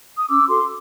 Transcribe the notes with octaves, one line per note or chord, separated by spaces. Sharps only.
D#6
C#4 D6 E6
F#4 A4 C6 D6